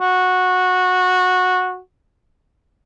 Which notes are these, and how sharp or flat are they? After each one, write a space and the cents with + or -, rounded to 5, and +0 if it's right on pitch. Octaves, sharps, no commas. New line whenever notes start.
F#4 -15